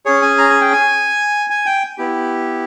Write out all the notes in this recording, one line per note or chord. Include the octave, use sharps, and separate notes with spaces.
C#4 G#4 C#5
G#5
A#5
G#5
G5
G#5
G#5
G5
B3 E4 G4